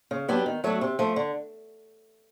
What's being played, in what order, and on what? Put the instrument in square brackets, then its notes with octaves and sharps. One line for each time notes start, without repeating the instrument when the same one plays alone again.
[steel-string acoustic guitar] C#3
F#3 B3 D4 G4
D#3
F#3 A3 D4 F#4
C3
F3 A3
D3